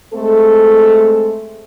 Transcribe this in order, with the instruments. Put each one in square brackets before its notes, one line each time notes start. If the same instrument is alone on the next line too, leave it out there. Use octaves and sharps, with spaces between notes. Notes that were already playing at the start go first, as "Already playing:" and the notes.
[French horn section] G#3 A3 C4 A4